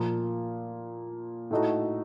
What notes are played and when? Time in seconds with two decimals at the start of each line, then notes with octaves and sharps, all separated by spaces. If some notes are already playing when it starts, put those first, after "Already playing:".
Already playing: A#2 F3 A#3
1.51 A2 A3 D#4 F#4